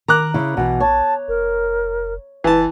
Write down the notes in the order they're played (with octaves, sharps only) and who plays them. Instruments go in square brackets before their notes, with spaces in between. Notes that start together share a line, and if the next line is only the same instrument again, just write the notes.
[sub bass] D#3 [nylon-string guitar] A#4 [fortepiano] A#5 D6 F#6
[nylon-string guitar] C#3 E4
[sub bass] A#1 [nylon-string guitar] B2 E3
[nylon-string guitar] C#5 [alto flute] A5
[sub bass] F1 [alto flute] A#4
[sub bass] F#1 [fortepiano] E3 A5 [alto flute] B4